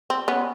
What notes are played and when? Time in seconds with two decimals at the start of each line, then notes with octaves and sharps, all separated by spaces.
0.10 C4
0.28 B3 C#4